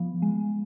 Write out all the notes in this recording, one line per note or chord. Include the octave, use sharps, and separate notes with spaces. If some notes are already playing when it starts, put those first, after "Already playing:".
Already playing: F3 B3
G#3